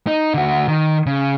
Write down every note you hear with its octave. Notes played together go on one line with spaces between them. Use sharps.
D#4
D3 F#4
D#3
C#3